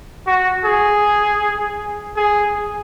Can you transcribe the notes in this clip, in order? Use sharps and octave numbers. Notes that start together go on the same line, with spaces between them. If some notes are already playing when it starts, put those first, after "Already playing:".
F#4
G#4
G#4